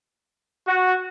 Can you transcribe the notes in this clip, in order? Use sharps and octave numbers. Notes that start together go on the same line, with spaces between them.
F#4